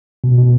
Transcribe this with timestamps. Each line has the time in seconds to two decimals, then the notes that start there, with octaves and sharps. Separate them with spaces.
0.24 B2
0.38 B2